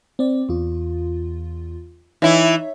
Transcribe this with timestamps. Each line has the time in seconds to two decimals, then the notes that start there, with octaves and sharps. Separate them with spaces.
0.19 C4 D5
0.49 E2 F4
2.22 E3 D#4 E4 C#5 E5